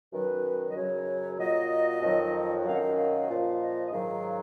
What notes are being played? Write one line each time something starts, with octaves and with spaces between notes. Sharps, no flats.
F#2 D#3 F#3 B4
D#5
F#2 C#3 F#3 C#5
A#2 F#3 D#5
F2 D#3 F#3
F#2 D#3 F#3 F5
F#5
F5
F5
A#2 F3
D#5
D#5
G#2 D#3 F#3 F5